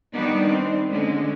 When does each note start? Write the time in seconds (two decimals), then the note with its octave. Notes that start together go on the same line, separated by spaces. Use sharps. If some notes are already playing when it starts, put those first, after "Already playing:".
0.15 D#3 G3 B3 D4 D#4 D5
0.52 C4
0.91 D3 G#3 C#4